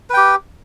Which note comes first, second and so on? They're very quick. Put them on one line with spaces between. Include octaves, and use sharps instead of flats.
B4 G5 G4